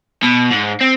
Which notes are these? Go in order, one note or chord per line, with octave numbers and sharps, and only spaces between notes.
B2
G#2
C4